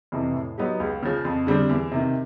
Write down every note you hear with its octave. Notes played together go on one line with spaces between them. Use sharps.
F2 C3 E3
A2
F#3 B3 D#4 G4
C#2
C#3 F3
F2
D3 G3 C4
E2
C3 D#3